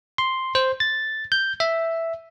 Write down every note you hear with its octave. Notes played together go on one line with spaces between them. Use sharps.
C6
C5
A6
G6
E5